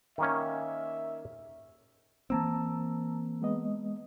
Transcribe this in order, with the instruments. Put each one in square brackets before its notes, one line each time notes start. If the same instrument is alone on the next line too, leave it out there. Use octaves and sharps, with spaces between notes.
[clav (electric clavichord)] D#3 A#3 C#4 [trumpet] E5
[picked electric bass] E3 A#3 C4 [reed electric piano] A5 A#5 E6
[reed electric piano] G#3 B3 D#5